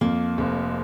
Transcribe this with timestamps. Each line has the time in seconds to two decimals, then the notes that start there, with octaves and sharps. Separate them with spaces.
0.01 F2 A#3
0.38 F1